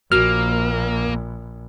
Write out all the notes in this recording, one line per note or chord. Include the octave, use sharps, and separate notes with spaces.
A#1 A#3 F#4 F6